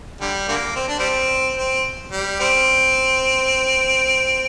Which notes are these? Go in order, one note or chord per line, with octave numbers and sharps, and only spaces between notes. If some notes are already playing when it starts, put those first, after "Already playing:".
D3 G3
D3 G3 A#3
C4
D4
G3 C4
C4
G3
G3 C4